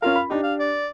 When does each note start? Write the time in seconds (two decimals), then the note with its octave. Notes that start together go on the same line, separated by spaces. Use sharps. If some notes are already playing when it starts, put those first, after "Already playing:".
0.02 C#4 F4 A#4 F5
0.16 B5
0.30 D4 D#4 G4
0.43 F5
0.59 D5